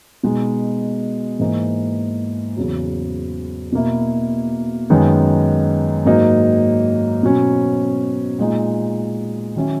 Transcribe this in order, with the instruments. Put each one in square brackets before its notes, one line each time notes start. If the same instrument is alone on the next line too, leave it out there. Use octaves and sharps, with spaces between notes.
[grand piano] B2 G#3 D#4
G#2 E3 A#3 D#4
E2 C#3 F#3
B2 A#3 E4
F#2 D#3 G#3 B3 D#4
G#2 F#3 A#3 D#4
B2 F#3 C#4
A#2 G#3 D#4
D#3 F#3 C#4 E4